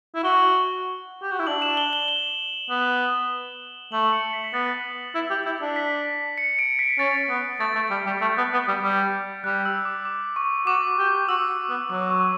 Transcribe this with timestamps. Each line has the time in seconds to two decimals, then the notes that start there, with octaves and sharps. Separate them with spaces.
0.15 E4
0.24 F#4 G7
1.22 G4
1.31 F#4
1.39 E4
1.47 D4 F#7
1.62 E7
1.77 G7
1.93 G7
2.08 G7
2.70 B3
3.92 A3 F#7
4.13 C#7
4.33 B6
4.44 B6
4.53 B3 A6
5.15 E4
5.30 G4
5.45 E4
5.62 D4
5.76 B6
6.38 C#7
6.59 D7
6.79 B6
6.99 C#4 A6
7.29 B3
7.60 A3 A6
7.75 A3
7.91 G3
8.06 G3
8.21 A3 G6
8.37 B3
8.53 B3
8.68 G3
8.83 G3
9.44 G3 F#6
9.65 E6
9.85 D6
10.05 D6
10.36 C#6
10.67 F#4 D6
10.99 G4
11.29 F#4 E6
11.70 B3
11.90 F#3 D6
12.10 C#6